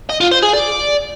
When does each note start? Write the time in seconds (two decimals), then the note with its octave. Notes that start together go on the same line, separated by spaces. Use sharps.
0.09 D#5
0.20 F4
0.31 C5
0.42 G#4
0.53 D5